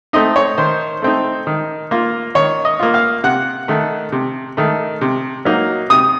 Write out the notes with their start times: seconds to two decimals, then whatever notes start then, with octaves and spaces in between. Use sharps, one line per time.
0.13 A3 C4 D#4 D#5
0.36 C#5
0.58 D#3 C5
1.02 A3 C4 D#4
1.47 D#3
1.91 A#3 F4
2.35 D#3 C#5
2.65 D#5
2.80 A#3 F4
2.94 F5
3.24 C3 F#5
3.68 D#3 A3
4.12 C3
4.57 D#3 A3
5.01 C3
5.45 F#3 A#3 D#4
5.90 C3 D#6